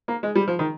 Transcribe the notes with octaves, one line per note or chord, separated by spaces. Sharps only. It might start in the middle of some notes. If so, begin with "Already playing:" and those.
A#3
G#3
G3
F3
D#3